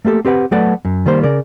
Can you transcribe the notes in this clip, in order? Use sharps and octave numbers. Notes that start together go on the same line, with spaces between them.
A3 A#3 G4 A4
C4 G4 B4 F#5
F#3 A3 B3 A4 D5 F#5
F#2
D#3 G3 A#3 C5
C#3 A#4 D5